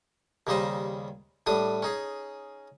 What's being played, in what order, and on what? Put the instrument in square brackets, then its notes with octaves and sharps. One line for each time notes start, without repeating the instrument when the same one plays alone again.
[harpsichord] D#2 C#3 G3 D#4 C5 D#5
A2 G3 D4 D#6
C#4 D#4 G#4